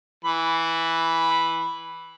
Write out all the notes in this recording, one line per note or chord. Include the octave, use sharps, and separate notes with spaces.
E3 B5